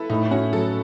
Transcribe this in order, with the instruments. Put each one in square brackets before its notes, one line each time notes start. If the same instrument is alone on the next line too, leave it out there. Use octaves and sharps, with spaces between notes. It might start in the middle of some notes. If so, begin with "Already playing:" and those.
Already playing: [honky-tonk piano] E4 A4 B4
[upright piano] A2 [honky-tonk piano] D#4
[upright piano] C#4 [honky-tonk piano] F#4
[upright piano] F#3 [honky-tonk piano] A4